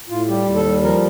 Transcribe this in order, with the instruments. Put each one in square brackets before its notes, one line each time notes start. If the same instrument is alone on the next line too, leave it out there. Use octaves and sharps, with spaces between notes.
[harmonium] A2 F4
G3 G4
D#2
A4
G3
F3 A#4